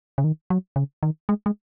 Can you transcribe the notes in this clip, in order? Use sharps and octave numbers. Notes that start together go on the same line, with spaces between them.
C#3
D#3
F#3
C#3
D#3
G#3
G#3